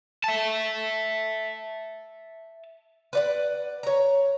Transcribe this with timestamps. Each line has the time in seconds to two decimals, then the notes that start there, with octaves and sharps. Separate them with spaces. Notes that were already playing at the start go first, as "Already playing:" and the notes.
0.24 E5 A5
3.13 B4 D5 F#5
3.83 C#5 A#5